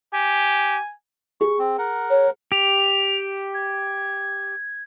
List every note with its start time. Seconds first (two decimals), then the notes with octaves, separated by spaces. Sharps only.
0.13 G4 G#5
1.41 G#4 C#6
1.59 C4
1.78 A#4 F#5
2.10 C#5
2.52 G4 F7
3.54 G#6